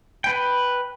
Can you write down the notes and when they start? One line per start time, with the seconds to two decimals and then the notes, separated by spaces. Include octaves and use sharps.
0.24 B4 G5